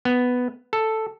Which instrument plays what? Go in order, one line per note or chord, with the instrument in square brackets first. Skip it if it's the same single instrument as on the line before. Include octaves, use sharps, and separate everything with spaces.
[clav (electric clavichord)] B3
A4